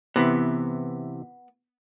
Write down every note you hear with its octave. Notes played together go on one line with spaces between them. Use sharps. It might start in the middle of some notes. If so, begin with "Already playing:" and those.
C3 E3 B3